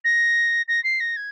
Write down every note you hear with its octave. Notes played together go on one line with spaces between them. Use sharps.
A#6
A#6
C7
A#6
G#6